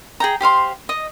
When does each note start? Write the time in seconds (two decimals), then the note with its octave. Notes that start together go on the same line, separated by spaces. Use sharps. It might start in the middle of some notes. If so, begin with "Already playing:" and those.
0.20 G#4 G5 A#5
0.41 G4 C5 F5 C6
0.89 D#5